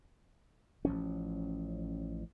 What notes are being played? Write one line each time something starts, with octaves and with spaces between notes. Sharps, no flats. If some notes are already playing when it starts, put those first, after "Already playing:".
A1 F3 C#4